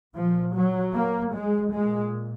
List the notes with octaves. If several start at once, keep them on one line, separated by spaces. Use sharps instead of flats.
A#2 F3
F#3
A#3
G#3
A#2 G#3